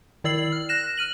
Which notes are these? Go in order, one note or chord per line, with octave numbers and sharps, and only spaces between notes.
D#3 E4 D5 E6 C7 F#7
F6
F#6 A#6 E7
F6 D#7 F#7